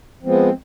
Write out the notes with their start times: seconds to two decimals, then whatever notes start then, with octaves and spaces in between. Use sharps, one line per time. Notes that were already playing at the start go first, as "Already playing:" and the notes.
0.23 F3 G#3 B3 C4